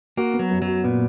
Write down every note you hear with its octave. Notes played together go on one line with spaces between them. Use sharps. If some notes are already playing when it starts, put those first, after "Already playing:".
A#3 F#4
B3
F#3
F#2
F#3
F#4
A#2 B3